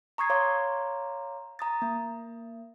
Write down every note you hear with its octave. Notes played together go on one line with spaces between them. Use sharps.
A#5 C#6 D#6 G#6 C7
C#5 F5 A#5 C6 D6
A#5 D#6 A6
A#3